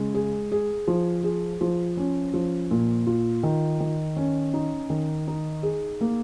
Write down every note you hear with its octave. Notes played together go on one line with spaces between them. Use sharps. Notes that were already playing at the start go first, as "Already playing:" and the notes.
Already playing: C#3 G#3
G#4
G#4
F3
G#4
F3
C#4
F3
A#2
F4
D#3
D#3
C#4
D#4
D#3
D#4
G#4
A#3